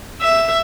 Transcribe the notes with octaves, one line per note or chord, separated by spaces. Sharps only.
E5